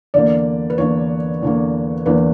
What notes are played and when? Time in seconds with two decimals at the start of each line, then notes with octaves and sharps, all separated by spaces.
0.14 E2 D3 A#3 D5
0.70 B4
0.78 E2 D3 A#3 C#5
1.42 E2 D3 A#3
2.06 E2 D3 A#3 B4